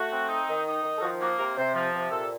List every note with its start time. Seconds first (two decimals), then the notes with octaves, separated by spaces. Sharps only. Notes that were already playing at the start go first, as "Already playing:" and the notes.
Already playing: A3 F#4
0.12 C4
0.29 D#4
0.48 D#3
0.66 D#4
0.83 D#3
0.98 A4
1.02 F3 F#4
1.20 A#3 F#4
1.38 C3 A#4
1.57 C3 C5
1.74 F3
1.94 C3
2.11 A#2 A4